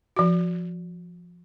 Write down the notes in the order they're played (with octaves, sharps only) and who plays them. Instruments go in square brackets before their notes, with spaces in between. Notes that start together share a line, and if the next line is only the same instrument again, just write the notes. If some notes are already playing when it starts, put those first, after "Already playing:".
[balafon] F3 F#4